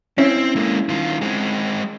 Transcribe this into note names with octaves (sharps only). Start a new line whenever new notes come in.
C4 C#4 E4
G#3 A#3
D#3 F4
G#3 C4